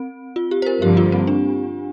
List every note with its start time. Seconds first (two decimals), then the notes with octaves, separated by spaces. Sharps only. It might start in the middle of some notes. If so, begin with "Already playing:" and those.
Already playing: C4
0.36 F4
0.51 G4
0.62 C5
0.66 A#4
0.82 G2 D3 F3 A#3 G4
0.97 F4
1.12 C4
1.27 D4